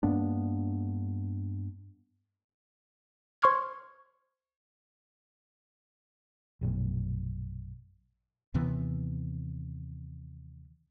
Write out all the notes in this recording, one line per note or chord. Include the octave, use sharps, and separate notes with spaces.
G2 A#3 B3 D4
C5 C6 C#6 F6 G#6
A#1 F#2 B2 A3
D#2 C3 E3 B3